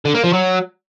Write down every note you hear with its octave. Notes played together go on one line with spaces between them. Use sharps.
D3
A#3
F3
F#3